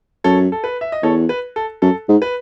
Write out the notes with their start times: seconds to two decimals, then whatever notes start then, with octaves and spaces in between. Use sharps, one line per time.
0.24 F#2 A4 C#5
0.52 A4
0.64 B4
0.81 E5
0.92 D#5
1.03 E2 A4 C#5
1.29 B4
1.56 A4
1.82 F#2 A4
2.09 G#2
2.22 B4